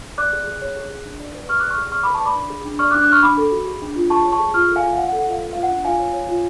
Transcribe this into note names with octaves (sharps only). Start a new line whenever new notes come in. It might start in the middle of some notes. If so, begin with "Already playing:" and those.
D5 D6 F#6
G#4
G#4
C#5
G#4
G#4
D4
D5
B4
G#4 C#6 F6
D6 F#6
D5
C#6 F6
G#4
D5 C#6 F6
B5 D6
B4
A5 C#6
D5 B5 D6
D4
G#4
D4
D5 C#6 F6
D6 F#6
D4
D6 F#6
D4 C#6 F6
D4 B5 D6
A4
F#4
G#4
D4
F4
G#4 A5 C#6
C#5
A5 C#6
G#4
F4 C#6 F6
A4
F5 G#5
F4
F5
D5 F#5
F#5
A4
F#5
F4 F5
B4
F4 F5
F#5
D4
F4 F5 G#5
C#5
C#5
F4